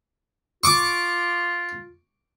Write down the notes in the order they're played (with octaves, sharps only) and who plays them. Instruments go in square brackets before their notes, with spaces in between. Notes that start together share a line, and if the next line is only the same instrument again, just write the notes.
[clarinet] F4 [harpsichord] C#6 D6